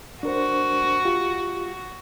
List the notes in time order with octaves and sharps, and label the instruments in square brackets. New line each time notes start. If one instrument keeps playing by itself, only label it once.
[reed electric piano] D4 A#4 C5 [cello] F#4
[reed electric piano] F4 G4